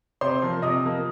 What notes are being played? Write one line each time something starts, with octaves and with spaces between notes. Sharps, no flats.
C3 C5 C6
F3 A#3
C3 D#5 D#6
F3 A#3